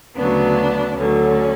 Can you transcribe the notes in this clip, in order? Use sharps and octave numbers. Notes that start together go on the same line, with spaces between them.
D2 C#3 F#3 B3 D4
D2 D3 F#3 C#4